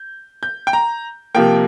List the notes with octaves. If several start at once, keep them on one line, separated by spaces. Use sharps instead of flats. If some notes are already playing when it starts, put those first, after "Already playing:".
Already playing: G6
G6
G5
A#5
C3 F3 A#3 G5